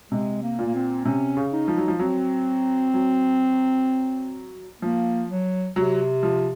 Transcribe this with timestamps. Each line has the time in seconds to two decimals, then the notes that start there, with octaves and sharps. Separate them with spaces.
0.11 C3 G#3
0.42 A#3
0.59 A#2
0.66 A#3
0.75 C4
1.05 C3 C#4
1.37 C#3
1.52 D#4
1.68 F3
1.77 F#3
1.88 F3
1.99 F#3 C4
2.94 F#3
4.82 F3 A#3
5.29 F#3
5.76 C3 F#3
6.23 F3